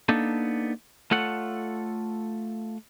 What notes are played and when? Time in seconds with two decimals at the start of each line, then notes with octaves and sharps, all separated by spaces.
0.09 A#3 B3 D4 D#4 A4
1.11 A3 F4 A4 C#5 F#5